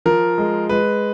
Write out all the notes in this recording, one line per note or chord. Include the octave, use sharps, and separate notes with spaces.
F3 A#4
G#3
G#3 B4